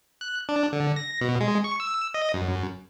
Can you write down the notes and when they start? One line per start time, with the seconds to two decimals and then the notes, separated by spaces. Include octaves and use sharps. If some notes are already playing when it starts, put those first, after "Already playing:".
0.21 F#6
0.49 D4
0.73 D3
0.96 A#6
1.21 B2
1.41 G#3
1.64 C#6
1.80 E6
2.14 D#5
2.34 F#2